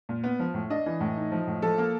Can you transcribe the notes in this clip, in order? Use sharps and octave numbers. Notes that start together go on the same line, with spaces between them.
A#2
B3
F3
A2
D4 D#5
E3
A2
D#4
F3
A2
F3 A4
A#3